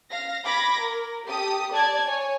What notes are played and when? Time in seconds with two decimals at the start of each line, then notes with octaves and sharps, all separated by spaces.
0.11 F5 A#6
0.45 B5 D6 G#6 A#6
0.80 A#4
1.26 G4 A4 D#6
1.70 D5 A5 G#6
2.07 C#5 G#5